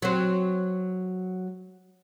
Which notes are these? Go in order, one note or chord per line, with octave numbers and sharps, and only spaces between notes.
F#3 C4